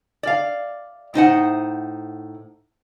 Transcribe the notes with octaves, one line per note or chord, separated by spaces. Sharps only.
D5 F5
A2 D#4 C5 F#5